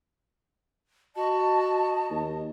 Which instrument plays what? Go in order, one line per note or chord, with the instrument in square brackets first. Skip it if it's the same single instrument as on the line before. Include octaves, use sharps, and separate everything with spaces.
[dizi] F#4 [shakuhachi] D#5 [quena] A5
[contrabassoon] D#2